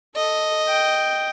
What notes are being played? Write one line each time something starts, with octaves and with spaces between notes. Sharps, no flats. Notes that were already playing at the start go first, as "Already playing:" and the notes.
A4 D#5
G5